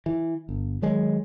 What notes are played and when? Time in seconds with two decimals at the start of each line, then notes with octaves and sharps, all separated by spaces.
0.06 E3
0.49 G1
0.82 D#3 F#3 G#3